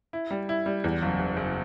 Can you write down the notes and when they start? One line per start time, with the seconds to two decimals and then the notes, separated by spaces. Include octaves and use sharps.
0.13 E4
0.31 G3
0.49 E4
0.66 G3
0.84 E2
1.02 F#1
1.19 F#1
1.37 F#1